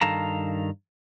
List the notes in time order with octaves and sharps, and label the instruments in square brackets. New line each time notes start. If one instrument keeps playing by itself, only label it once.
[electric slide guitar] G2 D#3 A4 F5 A5 A#5